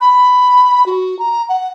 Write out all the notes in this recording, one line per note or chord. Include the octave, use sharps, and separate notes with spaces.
B5
F#4
A#5
F#5